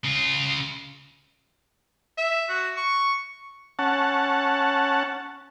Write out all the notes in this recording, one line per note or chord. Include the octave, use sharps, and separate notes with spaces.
C#3 F4
E5
F#4
C#6
C#4 F#5 A5